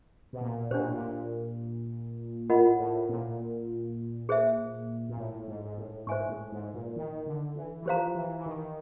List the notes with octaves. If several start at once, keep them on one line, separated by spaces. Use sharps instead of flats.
B2
A#2
B2 D4 G4 C5
A#2
A2
A#2
A2 F4 A#4 D#5 F#5 B5
A2
A#2
G#4 C5 E5
A#2
A2
G#2
G#2
A2
G#2 C5 E5 G#5 C#6
A2
G#2
A#2
D#3
D3
E3
E3
F3 G4 C5 F5 A#5
E3
E3
D#3